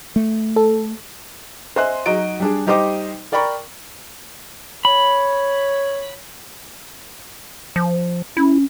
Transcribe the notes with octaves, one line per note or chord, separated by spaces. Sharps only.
A3
A4
C5 D#5 E5 G#5 C6 F#6
F#3 D#4 F#4 D#5 D7
G3 D4 G#4
G3 D#4 G4 C5 D#5 D6
A#4 D5 G5 A#5 B5 C#6
C#5 B5
F3
C#4 E4